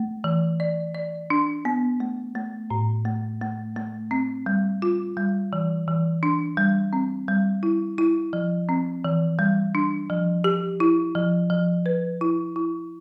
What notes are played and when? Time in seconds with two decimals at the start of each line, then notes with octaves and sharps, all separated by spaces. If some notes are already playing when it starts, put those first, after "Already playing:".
Already playing: A3
0.24 E3
0.60 D5
0.95 D5
1.30 D4
1.65 B3
2.00 A3
2.35 A3
2.70 A2
3.05 A3
3.42 A3
3.76 A3
4.11 C4
4.46 G3
4.82 F4
5.17 G3
5.53 E3
5.88 E3
6.23 D4
6.57 G3
6.93 C4
7.28 G3
7.63 E4
7.98 E4
8.33 F3
8.69 C4
9.05 E3
9.39 G3
9.75 D4
10.10 F3
10.44 G4
10.80 E4
11.15 F3
11.50 F3
11.86 B4
12.21 E4
12.56 E4